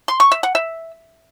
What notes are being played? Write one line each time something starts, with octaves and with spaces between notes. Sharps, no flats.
C6
C#6
E5
F#5
E5